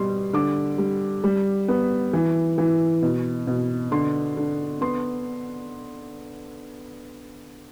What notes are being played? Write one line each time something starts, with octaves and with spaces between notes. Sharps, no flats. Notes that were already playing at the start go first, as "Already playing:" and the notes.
Already playing: B2 G3 C6
D3 D6
G3
G3
B3
E3
E3
B2
B2
D3 C6
D3
B3 C6